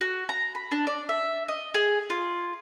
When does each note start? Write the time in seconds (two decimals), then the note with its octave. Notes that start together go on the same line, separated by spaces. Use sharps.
0.01 F#4
0.29 A#5
0.55 B5
0.71 D4
0.87 D5
1.09 E5
1.48 D#5
1.74 G#4
2.10 F4